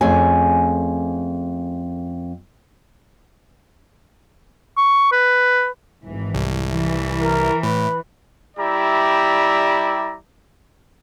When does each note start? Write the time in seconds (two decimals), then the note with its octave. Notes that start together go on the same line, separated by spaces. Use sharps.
0.01 F2 A3 C#4 G#4 G#5
4.77 C#6
5.12 B4
6.04 G#1 E3
6.35 C2
6.71 E3
7.21 A#4
7.63 A2 B4
8.57 G3 E4 G4 D5 E5 A#5